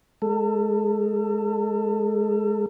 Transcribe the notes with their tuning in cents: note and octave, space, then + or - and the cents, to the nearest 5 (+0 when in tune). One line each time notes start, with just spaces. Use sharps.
G#3 +10 A4 +35